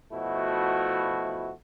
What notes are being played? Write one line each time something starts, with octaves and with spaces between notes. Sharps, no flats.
B2 F3 A3 E4 F#4